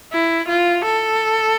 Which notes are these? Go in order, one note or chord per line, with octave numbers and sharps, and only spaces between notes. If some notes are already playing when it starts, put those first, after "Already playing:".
E4
F4
A4